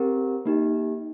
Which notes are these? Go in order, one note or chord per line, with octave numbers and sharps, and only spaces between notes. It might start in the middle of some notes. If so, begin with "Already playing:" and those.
Already playing: C4 G4 A#4
A#3 D#4 G4